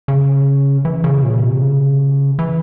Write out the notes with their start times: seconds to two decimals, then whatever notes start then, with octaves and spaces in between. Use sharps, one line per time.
0.08 C#3
0.85 E3
1.04 C#3
1.23 A#2
1.43 C3
1.62 C#3
2.39 E3